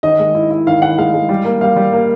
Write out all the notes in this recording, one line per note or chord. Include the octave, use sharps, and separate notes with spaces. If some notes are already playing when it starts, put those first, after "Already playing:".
D#3 D#5
G#3
E4
E4
D#3 F5
E4 F#5
G#3 F5
G#3
G3
A#3
G3 F5
G3
A#3